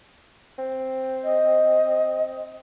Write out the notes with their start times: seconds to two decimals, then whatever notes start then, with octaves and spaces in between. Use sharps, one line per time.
0.58 C4
1.24 D#5